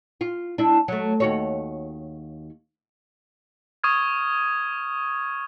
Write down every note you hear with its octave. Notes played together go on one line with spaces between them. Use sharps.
F4
D4 E4
F#3 A3
D#2 F#4 C#5
C#6 D#6 F6 G#6